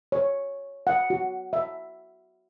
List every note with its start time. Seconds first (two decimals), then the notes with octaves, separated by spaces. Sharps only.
0.12 C#5
0.87 F#5
1.10 F#4
1.53 E5